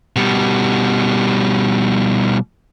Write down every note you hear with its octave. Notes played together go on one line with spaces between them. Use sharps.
B2 G3